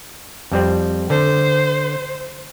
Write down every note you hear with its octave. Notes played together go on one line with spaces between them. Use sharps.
F2 G3 C4
D3 C5